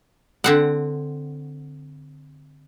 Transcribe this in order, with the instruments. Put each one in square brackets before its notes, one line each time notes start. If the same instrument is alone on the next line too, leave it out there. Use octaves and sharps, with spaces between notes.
[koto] D3 C4 F#5